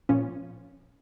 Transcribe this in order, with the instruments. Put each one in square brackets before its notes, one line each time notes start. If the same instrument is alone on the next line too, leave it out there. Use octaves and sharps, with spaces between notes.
[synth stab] A#2 F3 C#4